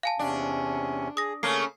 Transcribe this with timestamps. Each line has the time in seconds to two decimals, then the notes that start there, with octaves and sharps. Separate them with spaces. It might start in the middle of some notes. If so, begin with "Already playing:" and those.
0.03 F5 G#5 A5
0.19 E2 C3 C#4 D4
1.17 G#4 D#6 A#6
1.43 C#3 A3 A#3 C#4 C7